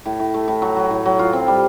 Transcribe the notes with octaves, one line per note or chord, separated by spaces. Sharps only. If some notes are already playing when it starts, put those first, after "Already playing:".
A2
A2
A3
A2
F#3
F#3
A2
F#3
F4
C4
G3